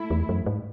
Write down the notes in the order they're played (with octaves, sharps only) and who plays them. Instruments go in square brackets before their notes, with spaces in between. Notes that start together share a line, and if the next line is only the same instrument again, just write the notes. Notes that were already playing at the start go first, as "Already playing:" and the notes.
Already playing: [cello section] A3 E4
[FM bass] E2
F#2
G#2